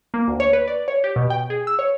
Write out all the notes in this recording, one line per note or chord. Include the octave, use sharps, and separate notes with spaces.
A#3
D2
C#5
B4
D5
C#5
G4
B2
G5
G#4
E6
C#5